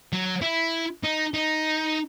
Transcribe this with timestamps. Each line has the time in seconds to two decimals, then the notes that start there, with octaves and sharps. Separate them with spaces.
0.13 F#3
0.42 E4
1.04 D#4
1.34 D#4